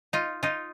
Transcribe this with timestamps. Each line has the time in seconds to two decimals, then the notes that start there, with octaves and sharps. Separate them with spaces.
0.13 D#4 F4
0.43 D#4 F4